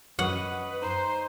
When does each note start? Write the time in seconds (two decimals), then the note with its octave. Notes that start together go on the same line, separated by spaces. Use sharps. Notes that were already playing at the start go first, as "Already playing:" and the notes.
0.19 F#2 B4 C#5 D#5 F#5
0.82 D#4 C5